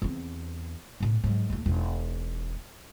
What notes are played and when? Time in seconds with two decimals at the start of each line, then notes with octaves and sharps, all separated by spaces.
0.02 E2 C4
1.00 B1 A2
1.24 G#2 F#3
1.50 D#2 A3
1.66 E1 D#4